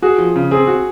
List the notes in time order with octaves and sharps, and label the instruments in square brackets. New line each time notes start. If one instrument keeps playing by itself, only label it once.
[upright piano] F#4 [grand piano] G#4
[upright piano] F3
C#3
[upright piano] C4 [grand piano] G#4
[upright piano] F#4